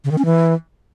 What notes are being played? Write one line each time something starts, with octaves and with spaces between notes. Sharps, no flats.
C#3
D#3
C#4
E3